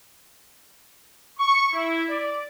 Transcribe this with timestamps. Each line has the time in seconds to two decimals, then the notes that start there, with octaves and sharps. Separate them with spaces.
1.38 C#6
1.73 E4
2.08 D5